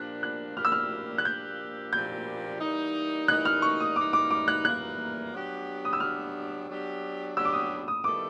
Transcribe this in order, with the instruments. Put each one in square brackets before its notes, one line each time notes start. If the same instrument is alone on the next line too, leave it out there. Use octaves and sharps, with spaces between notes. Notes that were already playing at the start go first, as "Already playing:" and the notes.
Already playing: [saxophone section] A#2 F3 A#3 D4 G4 [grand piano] F#6
[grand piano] F#6
[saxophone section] A#2 F3 A#3 D4 G4 [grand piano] F6
[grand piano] E6
F6
F#6
[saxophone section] A#2 F3 A#3 D4 G4 [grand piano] G6
[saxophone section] A#2 F3 A#3 D4 G4 [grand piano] G6
[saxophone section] E3 G3 A#3 D#4
[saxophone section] E3 G3 A#3 D#4 [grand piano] F#6
[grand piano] F6
C#6
D#6
[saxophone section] E3 G3 A#3 D#4 [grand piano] D6
[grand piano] D6
D6
F#6
[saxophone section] E3 G3 A#3 D#4 [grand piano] F#6
[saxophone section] F#3 B3 D4 G4
[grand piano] D#6
E6
[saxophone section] F#3 B3 D4 G4 [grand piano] F6
[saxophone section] F#3 B3 D4 G4
[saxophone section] F#3 B3 D4 G4 [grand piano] E6
[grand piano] D6
D#6
D#6
[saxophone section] D#3 G3 B3 E4 A4 [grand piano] D6